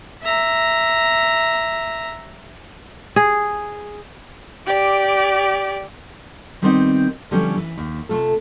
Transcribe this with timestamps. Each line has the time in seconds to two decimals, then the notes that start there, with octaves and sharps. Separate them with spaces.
0.23 E5 A#5
3.16 G#4
4.66 G4 D5
6.62 D#3 G3 B3 C4 D4 D#4
7.31 D3 F3 G3 A3 B3 C#4
7.57 E3
7.78 D#2
8.09 C3 A3 F4 A4